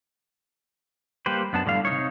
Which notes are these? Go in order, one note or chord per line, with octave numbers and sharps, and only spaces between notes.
G3 A#3 G4 B4 C5
F#2 B3 D4 A5
A2 D3 G3 F5
C3 D#4 C#5